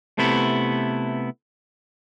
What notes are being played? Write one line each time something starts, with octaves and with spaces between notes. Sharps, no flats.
C3 A3 B3 E4